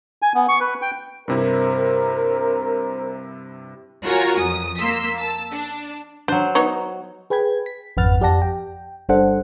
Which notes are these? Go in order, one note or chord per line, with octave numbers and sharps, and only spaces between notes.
G#5
B3
C#6
B4
G5
G2 C3 E4 A#4 C5
F4 F#4 A#4 C#5 G#5 A#5
F2 D#6
A#3 C6 E6 B6
A5 E6
D4
F#3 D4 C5
B3 D#4 C#5
G#4 B4 G5 B5 G#6
B6
G#1 F2 B4 F#5 F6 A6
F2 G4 D5 F#5 A5 A#6
G5
G1 G3 D4 A4 C5 F#5